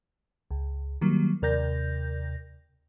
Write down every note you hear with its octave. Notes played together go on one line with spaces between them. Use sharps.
C#2
D#3 F#3 G3 A#3
D#2 C3 A#4 D5 G6 A#6